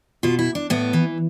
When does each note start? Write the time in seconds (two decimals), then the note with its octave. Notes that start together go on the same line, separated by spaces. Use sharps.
0.23 B2 F4
0.39 E4
0.55 D4
0.70 A2 B3
0.93 E3